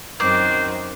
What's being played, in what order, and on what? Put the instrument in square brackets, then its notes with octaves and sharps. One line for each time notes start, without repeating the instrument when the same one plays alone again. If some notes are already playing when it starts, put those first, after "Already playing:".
[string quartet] F#2 D#3 C4 [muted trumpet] C5 [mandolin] D6 F#6